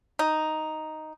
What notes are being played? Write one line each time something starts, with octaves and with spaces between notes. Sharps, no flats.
D#4